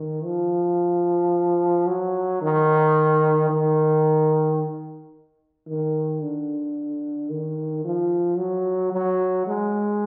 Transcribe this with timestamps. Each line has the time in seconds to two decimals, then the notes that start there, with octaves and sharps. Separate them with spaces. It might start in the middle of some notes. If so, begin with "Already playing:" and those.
Already playing: D#3
0.25 F3
1.87 F#3
2.42 D#3
3.50 D#3
5.67 D#3
6.22 D3
7.30 D#3
7.85 F3
8.38 F#3
8.92 F#3
9.47 G#3